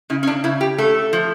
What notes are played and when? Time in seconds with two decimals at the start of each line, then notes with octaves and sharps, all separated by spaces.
0.10 C#3 E4
0.23 C#4
0.27 D4
0.44 C#3 E4
0.61 G4
0.78 A3 A4
1.13 F3